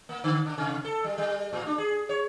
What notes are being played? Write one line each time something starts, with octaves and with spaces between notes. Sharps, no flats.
A#3
D3
C#3
C3
A4
G3
G3
A2
D4
G#4
C#5